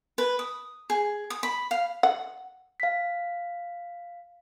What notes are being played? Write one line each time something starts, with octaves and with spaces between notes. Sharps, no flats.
B4
D#6
G#4
D#6
B5
F5
F#5
F5 B6